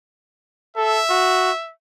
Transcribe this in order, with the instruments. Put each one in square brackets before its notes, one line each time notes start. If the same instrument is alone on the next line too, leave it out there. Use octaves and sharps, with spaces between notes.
[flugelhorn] A4 [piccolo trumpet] E5
[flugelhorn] F#4